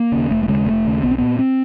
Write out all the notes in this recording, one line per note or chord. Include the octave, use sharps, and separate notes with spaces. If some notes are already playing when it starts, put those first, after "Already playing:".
Already playing: A#3
D#2 C#3
F1 A3
A3
D#2 C#3 G#3
F1 A3
D#2 C#3
B1 B3
C4
A#2 B3
C4